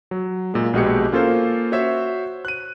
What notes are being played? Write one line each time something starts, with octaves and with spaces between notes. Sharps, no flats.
F#3
A#2 G#3
A#1 B2 G#3 F#4 G4 C#7
A#3 C#4 F4 A4 A#4 C5
F#4 C5 C#5 E5
F#6 D#7